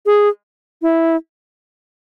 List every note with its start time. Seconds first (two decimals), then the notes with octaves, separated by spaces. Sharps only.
0.06 G#4
0.82 E4